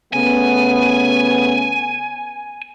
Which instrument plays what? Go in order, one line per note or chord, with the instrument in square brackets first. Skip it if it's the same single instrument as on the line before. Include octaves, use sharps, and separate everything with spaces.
[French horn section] C#3 A3 B3 [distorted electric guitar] G#5